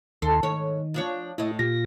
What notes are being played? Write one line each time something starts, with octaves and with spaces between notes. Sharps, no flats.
D#2 D#3 A4 C6
G#2 D#3 C#5
F3 D4 C#5
A2 E4 D#5
A#2 F4 G4 A#6